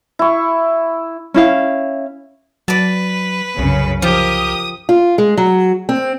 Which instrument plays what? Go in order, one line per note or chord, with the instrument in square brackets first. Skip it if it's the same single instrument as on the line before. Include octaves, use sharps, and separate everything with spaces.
[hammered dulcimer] E4 C#6
[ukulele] C#4 E4 F5
[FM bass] F#3 [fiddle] B4 [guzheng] D5 A5
[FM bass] C2 [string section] F#2 C#3
[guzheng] F3 [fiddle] G4 A#4 [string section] D#6
[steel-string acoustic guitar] F4
G#3
F#3
C4